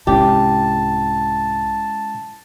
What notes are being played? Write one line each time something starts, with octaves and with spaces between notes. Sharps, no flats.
C2 G#2 G#3 C#4 E4 G4 A5